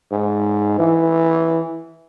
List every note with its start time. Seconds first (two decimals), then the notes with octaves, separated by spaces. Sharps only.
0.12 G#2
0.79 E3